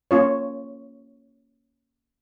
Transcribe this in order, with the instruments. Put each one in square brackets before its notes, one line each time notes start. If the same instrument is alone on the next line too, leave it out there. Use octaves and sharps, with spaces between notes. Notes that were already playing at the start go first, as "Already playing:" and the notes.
[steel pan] A#3 C#4 F4 C#5